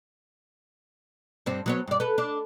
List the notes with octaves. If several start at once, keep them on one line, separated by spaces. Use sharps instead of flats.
G2 G3 C4
F#3 B3 C#5
G2 D5
A4 B4
D4